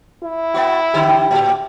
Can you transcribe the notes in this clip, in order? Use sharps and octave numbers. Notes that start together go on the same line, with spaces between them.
E4
B3 F#4
D3 G4
A2 G4